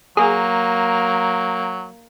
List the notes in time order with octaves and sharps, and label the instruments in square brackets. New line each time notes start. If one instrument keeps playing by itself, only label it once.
[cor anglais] F#3 [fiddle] A#3 [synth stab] G#4